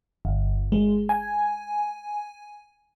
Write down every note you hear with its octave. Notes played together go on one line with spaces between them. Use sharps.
G1
G#3
G#5